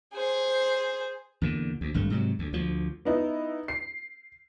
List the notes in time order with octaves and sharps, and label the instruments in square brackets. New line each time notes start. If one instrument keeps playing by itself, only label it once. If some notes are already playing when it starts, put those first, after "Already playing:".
[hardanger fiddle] G#4 C5
[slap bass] E2 A#2 D3
D2
G#1 G2 A3
G#2 C3 F#3
D2
D2 F3
[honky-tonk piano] B3 D#4 E4
C7